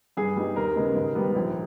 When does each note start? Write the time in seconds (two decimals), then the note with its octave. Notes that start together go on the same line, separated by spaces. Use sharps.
0.17 G2 G#4
0.36 G3 B3 D#4
0.56 D#2 A#4
0.76 C#3 G#3 B3
0.96 G#2
1.15 D#3 G3 B3
1.35 A#1